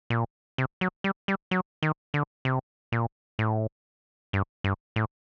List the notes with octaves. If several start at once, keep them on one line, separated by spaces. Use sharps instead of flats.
A#2
C3
F#3
G3
G3
F#3
D#3
D3
C3
A#2
A2
G2
G2
A2